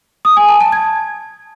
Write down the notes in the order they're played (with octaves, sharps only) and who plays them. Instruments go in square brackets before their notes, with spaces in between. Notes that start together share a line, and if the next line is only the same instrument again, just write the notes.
[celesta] D#6
G#5
A5
A5
G#6